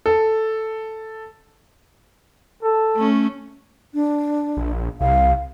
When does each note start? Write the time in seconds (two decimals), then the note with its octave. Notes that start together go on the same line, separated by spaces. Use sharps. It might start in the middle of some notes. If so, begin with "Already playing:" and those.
0.06 A4
2.63 A4
2.95 A3 C#4
3.94 D4
4.57 A#1
5.01 C2 F5